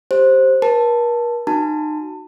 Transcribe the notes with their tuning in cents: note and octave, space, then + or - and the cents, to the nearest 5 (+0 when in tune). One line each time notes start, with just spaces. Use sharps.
G4 +0 C5 +10
A#4 +40 A5 +0
D#4 -30 F#4 +5 A5 +30